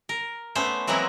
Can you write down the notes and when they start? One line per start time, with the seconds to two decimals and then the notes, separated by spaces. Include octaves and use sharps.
0.09 A#4
0.55 A3 B3 C#4 C5
0.87 E3 F#3 G#3 A#3 C4 E4